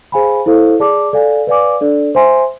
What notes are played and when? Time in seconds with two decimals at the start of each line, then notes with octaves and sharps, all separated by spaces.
0.12 G#4 C5 F5 G#5 B5
0.46 E4 A4 C5 F5
0.80 G#4 D5 A5 D6
1.13 A4 D5 F5 G#5
1.47 B4 D5 F5 G#5 D6
1.81 D4 A4 D5
2.15 C5 E5 G#5 C6